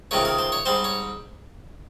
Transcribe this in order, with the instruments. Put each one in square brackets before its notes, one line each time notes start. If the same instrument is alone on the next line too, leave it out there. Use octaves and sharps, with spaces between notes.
[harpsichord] C#2 C3 D#3 G#3 C4 C#5
A#4
C5
C#5
G#2 G3 C4 C5
C#5